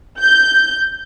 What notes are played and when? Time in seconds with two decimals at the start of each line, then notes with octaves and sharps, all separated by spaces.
0.19 G6